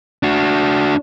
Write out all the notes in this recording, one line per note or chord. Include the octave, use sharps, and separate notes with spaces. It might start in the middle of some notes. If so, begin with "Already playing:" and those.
D4 F#4